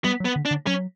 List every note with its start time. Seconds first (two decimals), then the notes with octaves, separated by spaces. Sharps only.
0.04 G3 B3
0.20 F#3
0.25 B3
0.36 D3
0.45 D4
0.51 D3
0.67 F#3 C#4